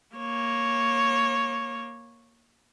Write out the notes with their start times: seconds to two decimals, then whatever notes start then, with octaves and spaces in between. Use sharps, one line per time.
0.17 A#3 C#5